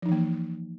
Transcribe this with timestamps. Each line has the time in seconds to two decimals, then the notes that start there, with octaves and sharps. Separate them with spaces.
0.02 F3
0.05 D#4
0.09 E3
0.12 A#3